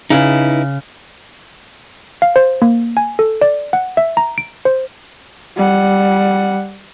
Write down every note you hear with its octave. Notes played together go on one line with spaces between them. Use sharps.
C#3 D#4 E4 B4
F5
C5
A#3
G#5
A4
D5
F#5
E5
A#5
D7
C5
G3 F#5